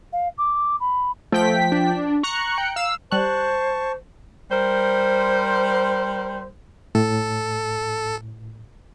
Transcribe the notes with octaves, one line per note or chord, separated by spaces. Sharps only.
F5
D6
B5
F3 A3 G5 B6
D4
A#5 C#6 F#6 C#7
G5
F5 E6
G3 C5 A5 C#6 F#6
G3 A#4 C5
A2 A4